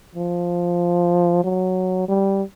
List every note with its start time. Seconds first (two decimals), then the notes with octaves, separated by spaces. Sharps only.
0.15 F3
1.44 F#3
2.08 G3